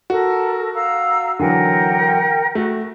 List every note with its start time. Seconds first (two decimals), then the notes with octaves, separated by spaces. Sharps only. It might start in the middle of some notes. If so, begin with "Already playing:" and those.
0.10 F#4 A4 A#4
0.74 F5 A#5 E6
1.39 D3 E3 F#3 A#4 F#5 G5
2.55 A3 F#4